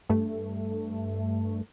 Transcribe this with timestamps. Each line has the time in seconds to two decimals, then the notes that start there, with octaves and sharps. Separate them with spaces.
0.09 G2 A3